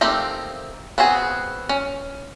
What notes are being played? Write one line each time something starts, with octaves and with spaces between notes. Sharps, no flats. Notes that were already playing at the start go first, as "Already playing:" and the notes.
A3 A#3 C4 D#4 G4
B3 C4 F#4 G#4 G#5
C#4